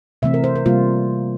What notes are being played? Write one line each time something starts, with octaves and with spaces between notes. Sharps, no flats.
C3 E3 A3 C4 E5
A#4
C5
A#4
C3 G3 A#3 F4